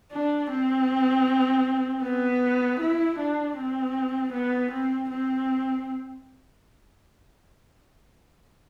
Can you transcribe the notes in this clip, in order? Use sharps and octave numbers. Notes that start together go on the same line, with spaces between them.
D4
C4
B3
E4
D4
C4
B3
C4
C4